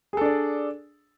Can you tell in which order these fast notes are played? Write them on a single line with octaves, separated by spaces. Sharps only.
G#4 A4 D4 D5